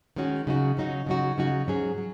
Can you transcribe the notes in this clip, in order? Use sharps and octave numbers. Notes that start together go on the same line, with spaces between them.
D#3 G#3 C#4 F#4
C#3 F#3 D#4 F#4
C#3 F#3 D#4 F#4
C#3 F#3 D#4 F#4
C#3 F#3 D#4 F#4
G#2 F#3 C#4 G#4
F#3